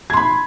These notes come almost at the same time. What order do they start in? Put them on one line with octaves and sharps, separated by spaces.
G#6 C6 B5